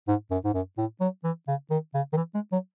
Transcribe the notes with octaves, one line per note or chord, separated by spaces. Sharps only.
G#2
F#2
G#2
F#2
A2
F#3
E3
C#3
D#3
C#3
D#3
E3
G#3
F#3